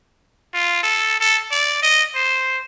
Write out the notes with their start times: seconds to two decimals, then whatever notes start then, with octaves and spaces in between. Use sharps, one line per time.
0.54 F4
0.83 A4
1.20 A4
1.51 D5
1.82 D#5
2.15 C5